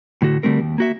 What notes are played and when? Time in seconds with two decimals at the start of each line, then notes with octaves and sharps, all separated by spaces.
0.22 A2 D3 A3 F#4
0.43 D3 G3 A3 C4 A#4
0.61 D#2
0.78 A#3 F#4 E5